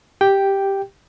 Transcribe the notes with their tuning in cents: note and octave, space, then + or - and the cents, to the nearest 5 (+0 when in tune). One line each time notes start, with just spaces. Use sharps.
G4 +0 G5 +0